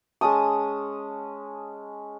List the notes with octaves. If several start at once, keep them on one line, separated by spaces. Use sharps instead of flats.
G#3 C#4 A5 D#6